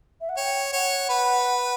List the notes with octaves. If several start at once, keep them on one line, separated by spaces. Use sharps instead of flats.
E5
F#5
C#5 G5
C#5 F#5
B4